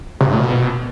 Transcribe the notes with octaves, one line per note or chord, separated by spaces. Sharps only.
C3
G2
A2
B2